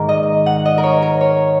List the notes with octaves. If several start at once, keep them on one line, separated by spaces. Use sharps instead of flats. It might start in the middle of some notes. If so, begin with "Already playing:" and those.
Already playing: G#2 D#3 A#3 A#4
D#5
F#5
D#5
A#4
C#5
A#4
C#5